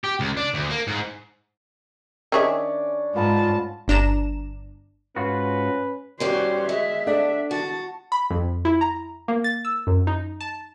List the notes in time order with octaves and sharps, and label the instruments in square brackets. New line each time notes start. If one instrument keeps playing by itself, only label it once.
[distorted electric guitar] G4
C#2
D4
D2
A#3
G#2
[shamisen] D#3 G#4 E5 [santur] C#4 D4
[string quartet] G#2 [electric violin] F4 A5 [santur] B4 F#5 A#5
[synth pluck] G1 D4 A#5 E7
[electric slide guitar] G#2 F4 F#4 [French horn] C#4 [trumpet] B4
[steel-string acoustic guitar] G2 G3 C#4 [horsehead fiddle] F#4 C5
[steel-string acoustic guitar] G#3 [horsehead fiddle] E5
[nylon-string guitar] D4 A4 F#5
[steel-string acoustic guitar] F#4 [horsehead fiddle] A5
[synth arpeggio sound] B5
F2
E4
A#5
A#3
A6
E6
F#2
D#4
A5